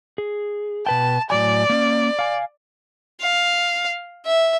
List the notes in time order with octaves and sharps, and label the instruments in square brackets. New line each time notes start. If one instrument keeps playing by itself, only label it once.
[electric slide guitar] G#4
[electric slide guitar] B2 B4 G5 [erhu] A5
[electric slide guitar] A2 F#3 G#5 [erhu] D5
[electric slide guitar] A#3 C#4
F5 G#5
[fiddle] F5
E5